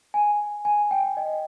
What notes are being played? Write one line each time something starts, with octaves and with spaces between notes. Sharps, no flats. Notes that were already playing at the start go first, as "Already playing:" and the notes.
G#5
G#5
G5
D#5